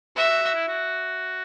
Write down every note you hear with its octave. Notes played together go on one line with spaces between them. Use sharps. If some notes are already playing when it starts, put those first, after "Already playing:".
F#4 E5
F#4
F#4
E4
F#4